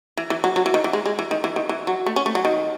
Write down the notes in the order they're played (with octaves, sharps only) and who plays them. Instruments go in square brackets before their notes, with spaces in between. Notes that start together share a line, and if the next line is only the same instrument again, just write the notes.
[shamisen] E3
E3
F#3
F#3
E3
D#3
E3
G#3
G#3
E3
D#3
E3
D#3
E3
F#3
A3
C#4
A3
F#3
D#3